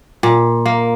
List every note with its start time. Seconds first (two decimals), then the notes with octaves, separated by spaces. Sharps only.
0.23 A#2
0.66 A#3